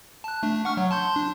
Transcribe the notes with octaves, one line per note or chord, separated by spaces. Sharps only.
A5 F#6
A3 D4
F#5 C#6 F6
F#3
A5 C6 G6
D4